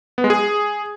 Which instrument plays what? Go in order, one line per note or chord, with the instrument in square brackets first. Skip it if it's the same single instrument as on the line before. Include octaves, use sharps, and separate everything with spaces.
[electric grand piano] B3
G#3
G#4